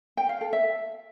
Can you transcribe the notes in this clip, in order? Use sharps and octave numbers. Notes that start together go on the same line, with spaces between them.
G5
F5
A4
E5